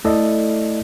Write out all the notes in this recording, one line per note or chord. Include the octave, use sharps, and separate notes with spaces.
A3 E4 A4 D5 D#5